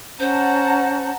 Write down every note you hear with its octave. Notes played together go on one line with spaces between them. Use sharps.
C#4 C5 F#5 A5 A#5